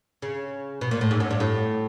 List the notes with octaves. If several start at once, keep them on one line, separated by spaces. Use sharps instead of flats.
C#3
B2
A#2
A2
G#2
F#2
G2
A2